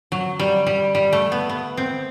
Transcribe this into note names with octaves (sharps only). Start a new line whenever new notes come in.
F#3
G3
G3
G3
A3
B3
B3
C4